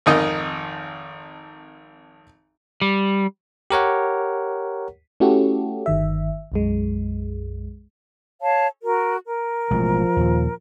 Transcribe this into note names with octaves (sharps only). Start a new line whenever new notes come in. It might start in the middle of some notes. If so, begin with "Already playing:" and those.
G#1 F2 D#3 D#5
G3
G4 A#4 C#5 F#5
A3 C#4 E4 F#4 G4 A4
G1 D#3 E5
B1 F#2 G#3
C#5 F5 A5
F#4 A#4
A#4
A1 B2 F3 G#3
D#2 A#2